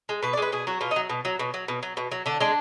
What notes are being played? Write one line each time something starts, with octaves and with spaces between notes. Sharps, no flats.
G#3
B2 B4
D5
G#3 B4
B2 G#4
F#3 F#4
B2 F4
D#4
F#3
B2
F#3
B2
F#3
B2
F#3
B2
F#3
D3 D4
G#3 D4